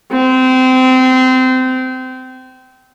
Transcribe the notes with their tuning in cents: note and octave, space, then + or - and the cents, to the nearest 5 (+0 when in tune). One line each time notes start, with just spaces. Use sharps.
C4 -25